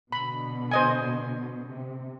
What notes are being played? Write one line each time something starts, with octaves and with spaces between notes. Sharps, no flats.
B2 D3 B5
C5 D#5 G#5
C3